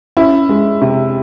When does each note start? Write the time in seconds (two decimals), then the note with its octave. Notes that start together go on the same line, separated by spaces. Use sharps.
0.17 C#4 E4
0.49 G#3
0.82 C3